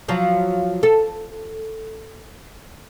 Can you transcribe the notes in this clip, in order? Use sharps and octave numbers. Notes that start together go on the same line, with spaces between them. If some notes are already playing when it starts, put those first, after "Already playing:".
F3 F#3 F4
A4